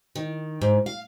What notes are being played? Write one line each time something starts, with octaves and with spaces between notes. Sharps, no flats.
D#3
G#2
F5